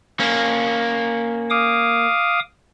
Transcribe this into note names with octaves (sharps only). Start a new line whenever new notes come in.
A#3 C#4
F5 D6 D#6